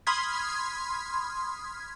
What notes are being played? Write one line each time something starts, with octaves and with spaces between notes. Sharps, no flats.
B5 C6 D#6 F6 G#6 B6